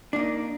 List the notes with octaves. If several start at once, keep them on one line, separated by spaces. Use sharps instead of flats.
A#3 D4 D#4